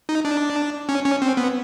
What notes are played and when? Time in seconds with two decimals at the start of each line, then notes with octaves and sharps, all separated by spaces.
0.09 D#4
0.25 D4
0.89 C#4
1.05 C#4
1.22 C4
1.37 B3